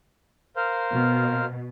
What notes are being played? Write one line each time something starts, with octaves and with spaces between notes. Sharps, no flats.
A#4 C5 F5
B2